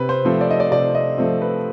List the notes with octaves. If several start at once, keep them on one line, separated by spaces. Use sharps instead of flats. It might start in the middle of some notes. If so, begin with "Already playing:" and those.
Already playing: C3 B4
C5
F3 A3 C4
D5
D#5
D5
C3 D5
D#5
F3 A3 C4
B4